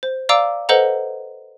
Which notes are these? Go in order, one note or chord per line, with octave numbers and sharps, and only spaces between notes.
C5
D5 F5 A#5 D6 E6 D7
A4 B4 C5 D#5 F#5 A#5